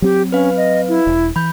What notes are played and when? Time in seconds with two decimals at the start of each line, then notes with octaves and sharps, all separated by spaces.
0.02 F#3 C4 G4
0.32 C#4 B4 F5
0.57 D#5
0.88 E4
1.07 E1
1.36 E3 B5 G6